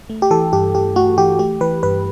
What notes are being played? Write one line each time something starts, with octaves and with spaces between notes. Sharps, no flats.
A3
G4
E3 A4
G2 G4
G2 G4
A3 F#4
E3 G4
A3 G4
E3 B4
G2 B4